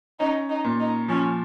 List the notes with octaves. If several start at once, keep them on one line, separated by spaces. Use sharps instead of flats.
C#4 D#4
D#4
A#2
D#4
F3 C#4